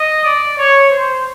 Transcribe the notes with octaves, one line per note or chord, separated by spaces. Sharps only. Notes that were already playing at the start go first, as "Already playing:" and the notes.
Already playing: D#5
D5
C#5
C5